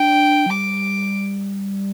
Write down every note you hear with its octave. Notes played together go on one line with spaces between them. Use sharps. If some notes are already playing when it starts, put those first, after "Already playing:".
Already playing: D4 G5
F#3
G3 D6